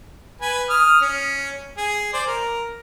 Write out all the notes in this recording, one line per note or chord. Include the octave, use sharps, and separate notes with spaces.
B4 G#5
D#6 F6
C#4
G#4
C5 D5
A#4